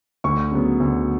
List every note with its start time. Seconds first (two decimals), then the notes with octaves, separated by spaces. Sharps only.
0.24 D2 C#6
0.52 C#3 F#3 B3
0.80 D2